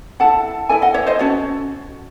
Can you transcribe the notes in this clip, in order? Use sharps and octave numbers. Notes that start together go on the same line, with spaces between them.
E4 A4 F#5 A5
E4 A4 E5 G#5
D#5 F#5
C#5 E5
C5 D#5
C#4 F#4 A4 C#5